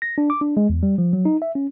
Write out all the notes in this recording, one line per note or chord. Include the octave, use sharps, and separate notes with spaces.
A#6
D4
D6
D4
G#3
E2
G3
F3
F#3
D#4
E5
C#4